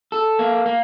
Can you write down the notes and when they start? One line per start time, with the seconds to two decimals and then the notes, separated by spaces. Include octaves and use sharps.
0.12 A4
0.39 A#3
0.66 A#3